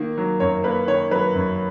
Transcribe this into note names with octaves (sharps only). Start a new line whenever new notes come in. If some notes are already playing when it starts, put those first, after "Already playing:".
Already playing: D#3 A#3
F#3
F#2 C#5
A#3 B4
D#3 C#5
F#3 B4
F#2